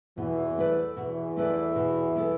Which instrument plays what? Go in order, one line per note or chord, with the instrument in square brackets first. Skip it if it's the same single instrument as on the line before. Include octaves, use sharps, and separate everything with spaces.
[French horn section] E2 E3 [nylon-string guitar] B2
[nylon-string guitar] A3 E4 B4 D5
[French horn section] E2 E3 [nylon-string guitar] B2
[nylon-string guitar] A3 E4 B4 D5
B2
B3 E4 A4